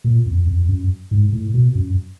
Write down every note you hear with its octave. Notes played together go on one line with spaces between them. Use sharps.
A#2
F2
F2
F#2
G#2
A2
B2
F#2